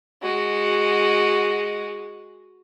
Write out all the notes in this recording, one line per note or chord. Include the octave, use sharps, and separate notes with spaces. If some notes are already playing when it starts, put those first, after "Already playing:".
G#3 F#4